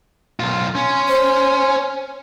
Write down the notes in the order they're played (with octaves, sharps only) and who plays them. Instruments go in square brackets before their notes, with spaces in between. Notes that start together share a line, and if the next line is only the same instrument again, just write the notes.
[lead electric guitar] B1 F4
[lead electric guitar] C#4 [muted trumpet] C6
[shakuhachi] C5